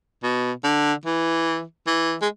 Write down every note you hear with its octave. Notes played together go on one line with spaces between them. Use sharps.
B2
D3
E3
E3
G#3